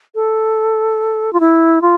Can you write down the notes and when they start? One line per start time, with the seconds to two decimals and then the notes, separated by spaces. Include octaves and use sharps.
0.15 A4
1.33 F4
1.40 E4
1.82 F4